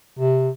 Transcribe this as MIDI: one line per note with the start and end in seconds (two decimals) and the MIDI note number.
0.19 0.49 48